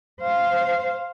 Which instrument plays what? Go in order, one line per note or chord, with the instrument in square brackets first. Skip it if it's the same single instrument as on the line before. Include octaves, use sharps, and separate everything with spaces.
[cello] C5 F5